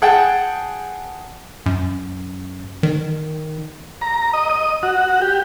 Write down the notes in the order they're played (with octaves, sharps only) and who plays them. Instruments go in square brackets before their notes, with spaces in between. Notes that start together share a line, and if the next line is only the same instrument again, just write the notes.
[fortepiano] G#4 F#5 G5 A5
[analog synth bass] F#2
D#3
[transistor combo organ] A#5
D#5
D#5
F#4
G4